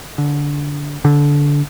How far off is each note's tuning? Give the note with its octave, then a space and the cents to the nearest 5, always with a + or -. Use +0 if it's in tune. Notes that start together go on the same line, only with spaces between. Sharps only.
D3 -15
D3 -20